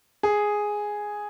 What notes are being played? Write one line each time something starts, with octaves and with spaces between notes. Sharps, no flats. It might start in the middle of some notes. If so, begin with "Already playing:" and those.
G#4